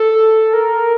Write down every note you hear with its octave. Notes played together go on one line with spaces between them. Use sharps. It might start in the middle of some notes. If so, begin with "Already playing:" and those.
Already playing: A4
A#4